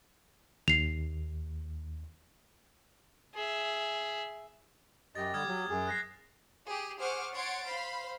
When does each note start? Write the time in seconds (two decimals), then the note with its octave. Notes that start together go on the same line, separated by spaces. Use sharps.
0.68 D#2 C7 F7
3.34 G#4 E5
5.15 F#2 G4 D#5 A6
5.34 D3 G3 D#6 F6 G#6
5.48 F#3
5.70 F#2 G#4
5.87 F#6 A#6 C7
6.67 G4 G#4
7.00 G#4 C5 F#5 C#6 D6 F6
7.33 C#5 F#5 C6 G#6 A6 D7
7.65 C5 F5 B5 C6